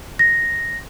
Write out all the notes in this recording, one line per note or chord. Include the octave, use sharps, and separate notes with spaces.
A#6